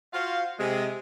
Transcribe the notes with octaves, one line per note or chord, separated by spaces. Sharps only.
F4 F#4 C5 F5
C3 G#3